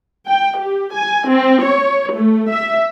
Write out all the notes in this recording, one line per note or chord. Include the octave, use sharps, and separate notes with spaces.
G5
G4
G#5
C4
C#5
A3
E5